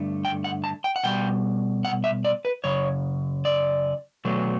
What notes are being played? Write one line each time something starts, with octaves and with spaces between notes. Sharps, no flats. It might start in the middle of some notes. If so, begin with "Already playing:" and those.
Already playing: G2 D3 A3
G5
F#5
A5
G5
F#5
B2 G3 G5
F#5
E5
D5
B4
F#2 C#3 C#5
D5
B2 F#3 A3